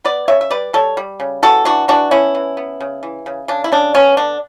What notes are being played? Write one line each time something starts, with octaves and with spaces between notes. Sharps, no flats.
B3 B4 D5
C#3 C#5 E5
E5
G3 B4 D5
G3 A4 C#5
G3
C#3
E3 F#4 A4
E3 D4 F#4
E3 D4 F#4
B3 C#4 E4
E3
B3
C#3
E3
C#3
C#3 D4
E4
C#3 D4
B3 C#4
D3 D4